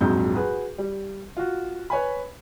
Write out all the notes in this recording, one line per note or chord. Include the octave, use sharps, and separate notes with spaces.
A#1 F2 G#2 F#3 G6
F#4 G#4 B4
G3
F4 F#4
B4 C#5 G#5 B5